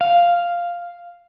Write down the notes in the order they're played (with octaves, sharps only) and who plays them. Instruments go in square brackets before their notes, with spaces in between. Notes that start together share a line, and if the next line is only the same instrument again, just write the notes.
[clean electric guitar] F5